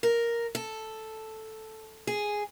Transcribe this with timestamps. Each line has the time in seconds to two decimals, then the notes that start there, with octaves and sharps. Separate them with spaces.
0.03 A#4
0.55 A4
2.07 G#4